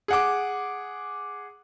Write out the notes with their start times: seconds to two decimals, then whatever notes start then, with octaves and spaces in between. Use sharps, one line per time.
0.08 G#4 F#5 D6